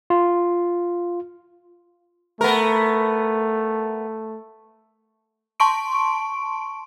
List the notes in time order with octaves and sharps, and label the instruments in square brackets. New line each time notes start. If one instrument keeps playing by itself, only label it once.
[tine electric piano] F4
[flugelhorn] A3 [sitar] B3 A#4
[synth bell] A5 C6 C#6 D7